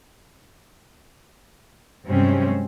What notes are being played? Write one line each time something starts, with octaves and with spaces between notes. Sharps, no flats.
G2 C3 F#3 G#3 C4 C#4